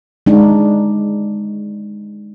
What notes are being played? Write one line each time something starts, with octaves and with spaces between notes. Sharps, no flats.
G#3 D4 D#4